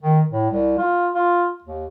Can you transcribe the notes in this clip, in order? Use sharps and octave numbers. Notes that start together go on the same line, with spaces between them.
D#3
A2
C2
F4
F4
D#2